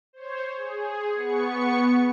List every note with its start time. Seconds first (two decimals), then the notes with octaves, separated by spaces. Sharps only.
0.13 C5 C#5
0.56 G#4
1.14 B3 C#6 C#7